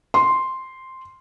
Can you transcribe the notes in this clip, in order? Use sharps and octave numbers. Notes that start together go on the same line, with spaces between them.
C6